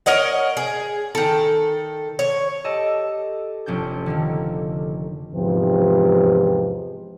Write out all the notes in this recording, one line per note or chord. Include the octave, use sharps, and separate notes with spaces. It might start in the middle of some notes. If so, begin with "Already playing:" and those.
A#4 C#5 D#5 F#5
G#4
D#3 A4
C#5
G4 A4 D5 D#5 A5
F1 C#4 D4 G6
D3 D#3 A#3
E2 G#2 C3 F3 G4 B4